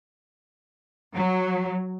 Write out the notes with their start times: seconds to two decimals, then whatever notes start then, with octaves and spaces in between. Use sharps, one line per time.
1.16 F#3